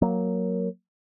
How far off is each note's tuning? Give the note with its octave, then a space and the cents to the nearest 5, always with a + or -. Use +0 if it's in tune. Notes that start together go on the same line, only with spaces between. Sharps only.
F#3 +0 A#3 +0